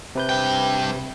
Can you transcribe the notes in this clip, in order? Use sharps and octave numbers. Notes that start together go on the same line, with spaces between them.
C3 B4 G6
G2 G5